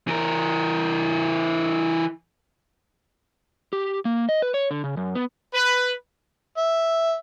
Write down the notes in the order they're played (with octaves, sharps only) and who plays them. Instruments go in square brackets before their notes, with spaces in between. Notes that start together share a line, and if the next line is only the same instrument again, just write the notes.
[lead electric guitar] E3 A#4
[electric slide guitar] G4
A#3
D#5
B4
C#5
D3
C#3
F#2
B3
[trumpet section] B4
[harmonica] E5